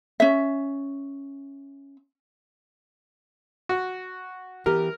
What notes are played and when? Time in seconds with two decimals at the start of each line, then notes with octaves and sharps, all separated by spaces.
0.20 C#4 E5
3.69 F#4
4.66 E3 B3 G4 A#4